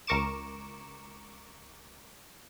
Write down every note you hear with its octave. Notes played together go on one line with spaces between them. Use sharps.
C#2 A#4 C#6 D6 E7